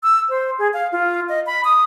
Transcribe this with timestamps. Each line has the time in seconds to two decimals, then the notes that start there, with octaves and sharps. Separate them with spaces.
0.03 E6
0.29 C5
0.59 G#4
0.74 F5
0.92 F4
1.29 D#5
1.46 B5
1.65 D#6